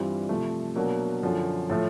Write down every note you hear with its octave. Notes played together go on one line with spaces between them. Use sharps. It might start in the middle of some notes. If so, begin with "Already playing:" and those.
Already playing: G2 E3 G3 C4 F4
C3 F3 A3
B2 F#3 A#3 D4
F#2 D3 F3
A2 F3 A3